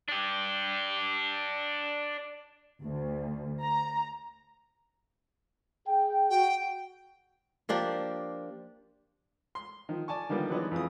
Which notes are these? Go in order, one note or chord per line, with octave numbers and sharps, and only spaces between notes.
D4 G4
D2
A#5
G#4 G5
F#4 G5
F3 A#3 D4 G4
C6
D#3 F3
D5 G#5 A5 C#6
D3 D#3 F3 G3 A#3 B3
E3 F#3 G#3 B3 D4 D#4
F2 E3 G#4 D#6